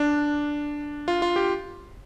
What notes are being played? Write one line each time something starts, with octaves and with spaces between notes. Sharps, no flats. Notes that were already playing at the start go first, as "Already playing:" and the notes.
Already playing: D4
F4
F4
G4